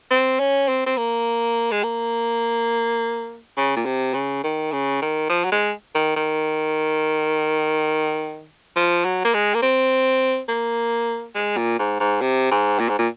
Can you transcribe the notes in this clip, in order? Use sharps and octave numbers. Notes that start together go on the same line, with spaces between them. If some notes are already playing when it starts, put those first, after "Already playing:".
C4
C#4
C4
C4
A#3
G#3
A#3
C#3
A#2
C3
C#3
D#3
C#3
D#3
F3
F#3
G#3
D#3
D#3
F3
F#3
A#3
G#3
A#3
C4
A#3
G#3
A#2
G#2
G#2
C3
G#2
A#2
G#2
A#2